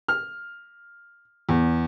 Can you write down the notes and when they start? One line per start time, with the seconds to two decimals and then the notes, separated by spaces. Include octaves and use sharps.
0.08 F6
1.49 E2